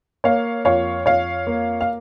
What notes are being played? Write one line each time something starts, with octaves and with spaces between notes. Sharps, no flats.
A#3 C#5 F5
F2 C#5 F5
F2 C#5 F5
A#3
F5